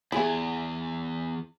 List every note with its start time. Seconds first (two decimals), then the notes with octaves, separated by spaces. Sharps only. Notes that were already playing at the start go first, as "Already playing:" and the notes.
0.12 E2 E4 G#4